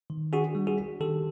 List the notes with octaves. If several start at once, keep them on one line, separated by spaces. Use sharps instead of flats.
D#3
D4 F#4 G#4
G3
F#4 G#4
D4
D#3 G4 A4